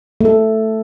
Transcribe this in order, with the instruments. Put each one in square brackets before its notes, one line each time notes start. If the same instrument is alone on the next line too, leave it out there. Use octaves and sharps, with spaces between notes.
[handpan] A3 A4